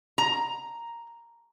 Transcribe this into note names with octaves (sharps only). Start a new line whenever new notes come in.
A#5